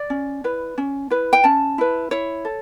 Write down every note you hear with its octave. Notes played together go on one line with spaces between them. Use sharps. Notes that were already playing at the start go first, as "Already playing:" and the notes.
Already playing: D5
C#4
E4 B4
C#4
E4 B4
G5
C#4 A5
E4 B4
E4 C#5
A4